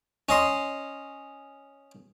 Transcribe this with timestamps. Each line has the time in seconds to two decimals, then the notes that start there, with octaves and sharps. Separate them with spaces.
0.29 C#4 D#5 C6